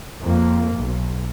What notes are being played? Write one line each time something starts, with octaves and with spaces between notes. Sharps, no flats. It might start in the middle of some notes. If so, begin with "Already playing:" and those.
F2 A#3
B1